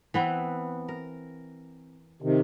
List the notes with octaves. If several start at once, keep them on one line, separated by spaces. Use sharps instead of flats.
E3 B3 C4
A#4
C3 D#3